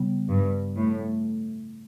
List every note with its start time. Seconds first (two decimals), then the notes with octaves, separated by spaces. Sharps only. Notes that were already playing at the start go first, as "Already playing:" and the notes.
Already playing: C#3 G3 B3
0.28 G2
0.76 A2